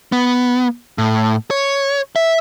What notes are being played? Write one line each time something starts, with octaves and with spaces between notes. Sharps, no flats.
B3
A2
C#5
E5